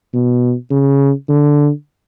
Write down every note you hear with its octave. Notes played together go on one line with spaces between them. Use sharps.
B2
C#3
D3